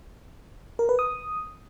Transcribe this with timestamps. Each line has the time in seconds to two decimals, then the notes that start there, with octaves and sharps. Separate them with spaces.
0.79 A#4
0.89 B4
0.99 D#6